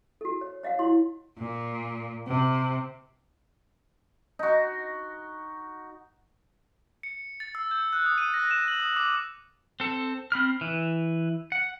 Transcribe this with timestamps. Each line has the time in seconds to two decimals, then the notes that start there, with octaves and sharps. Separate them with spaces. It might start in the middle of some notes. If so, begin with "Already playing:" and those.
0.21 F#4 A4
0.41 C#5
0.63 C#5 D#5 F5 F#5
0.79 E4 F#4 C6
1.37 A#2
2.27 C3
4.39 D#4 F#4
7.03 C#7
7.40 A6
7.55 E6
7.71 G6
7.93 F#6
8.06 D#6
8.18 D#7
8.34 A#6
8.51 E7
8.68 F#7
8.80 D#6
8.96 D6
9.80 C4 A4
10.32 C4 B5 F6
10.61 E3
11.52 F#5